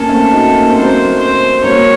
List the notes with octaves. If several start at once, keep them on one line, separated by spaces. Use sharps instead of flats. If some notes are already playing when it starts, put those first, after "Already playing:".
Already playing: A#3 C#4 A4
A3 C4
D#4 F#4
A#3
C4
F#3 A#3 C5
C5
F#3 A#3 C#5